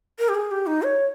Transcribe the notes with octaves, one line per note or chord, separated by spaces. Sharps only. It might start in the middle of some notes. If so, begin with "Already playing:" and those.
A#4
G4
G#4
G4
D#4
C#5